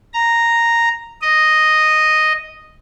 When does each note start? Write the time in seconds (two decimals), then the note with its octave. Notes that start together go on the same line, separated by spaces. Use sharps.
0.13 A#5
1.22 D#5